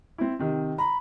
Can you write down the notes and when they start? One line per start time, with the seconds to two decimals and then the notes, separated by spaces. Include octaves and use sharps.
0.18 C4 E4
0.39 C3 D#3
0.78 A#5 B5